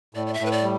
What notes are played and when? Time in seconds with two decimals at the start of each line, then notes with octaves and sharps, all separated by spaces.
0.15 A2 D5
0.27 D5
0.34 E5
0.40 A2
0.46 B4
0.52 D5
0.63 G3